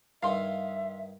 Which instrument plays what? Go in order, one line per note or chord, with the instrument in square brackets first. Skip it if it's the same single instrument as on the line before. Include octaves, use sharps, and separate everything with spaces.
[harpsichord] G2 D#3 [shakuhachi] E5 [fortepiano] F5 C6